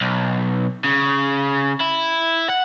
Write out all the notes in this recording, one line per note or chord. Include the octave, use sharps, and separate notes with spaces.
B1
C#3
E4
F#5